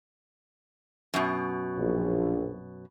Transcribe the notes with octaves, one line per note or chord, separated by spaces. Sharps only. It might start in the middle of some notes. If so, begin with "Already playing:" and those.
F#2 B2
A#1